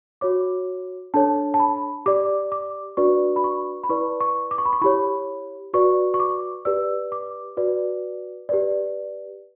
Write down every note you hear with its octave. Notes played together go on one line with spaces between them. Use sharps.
F#4 C#5 D6
D4 A4 C#5 A5
A5
B5
G4 D5 D6
D6
D4 F#4 B4 D5 C#6
B5
C#6
B5
E4 B4 D5 C#6
C#6
D6
C#6
B5
C#6
E4 G4 C#5 B5
F#4 B4 D5 C#6
C#6
D6
G4 B4 D5 E6
D6
F#4 B4 D5
G4 B4 D5